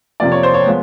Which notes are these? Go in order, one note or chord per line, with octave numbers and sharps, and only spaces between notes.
F2 C3 F3 A#3 D5
C#5
C5
C#5
F3 G#3 B3